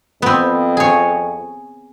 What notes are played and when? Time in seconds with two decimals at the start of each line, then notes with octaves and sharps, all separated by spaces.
0.22 F2 B3 C4
0.77 G#4 C#5